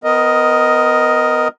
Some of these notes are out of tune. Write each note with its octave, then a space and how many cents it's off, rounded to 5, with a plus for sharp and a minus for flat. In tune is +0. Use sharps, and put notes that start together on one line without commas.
B3 +30 A#4 +0 D#5 +0